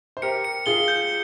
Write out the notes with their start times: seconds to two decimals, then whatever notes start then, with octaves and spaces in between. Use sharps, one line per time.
0.17 C5
0.22 G4 A#4 C#7
0.44 C#7
0.66 F4 G#4 G7
0.88 G6